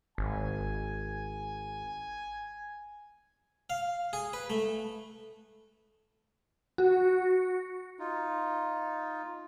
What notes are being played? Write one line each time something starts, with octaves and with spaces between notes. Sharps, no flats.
G#1 G#5
F5
G#4
B4
A3
F#4
D#4 F4